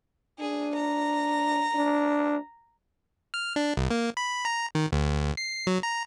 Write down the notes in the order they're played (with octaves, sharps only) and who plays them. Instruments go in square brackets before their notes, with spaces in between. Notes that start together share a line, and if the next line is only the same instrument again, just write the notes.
[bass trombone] D4 [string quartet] G#4
[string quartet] A#5
[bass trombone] D4
[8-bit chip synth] F6
D4
C2
A#3
B5
A#5
D#3
D2
C7
F#3
A#5